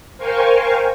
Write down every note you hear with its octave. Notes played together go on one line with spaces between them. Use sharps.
A#4 C5 F5 G5 G#5 C#6